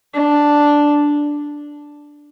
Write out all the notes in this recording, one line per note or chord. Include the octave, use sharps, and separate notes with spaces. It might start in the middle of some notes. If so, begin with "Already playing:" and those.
D4